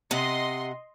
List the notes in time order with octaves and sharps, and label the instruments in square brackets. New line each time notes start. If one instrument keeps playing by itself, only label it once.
[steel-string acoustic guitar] C3 F#5 [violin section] D#5 C6